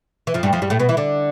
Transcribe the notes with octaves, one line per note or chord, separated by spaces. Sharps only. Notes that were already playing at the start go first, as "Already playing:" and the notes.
E3
F2 F3
G2 G3
F2 F3
G2 G3
A2 A3
B2 B3
E3 E4
D3 D4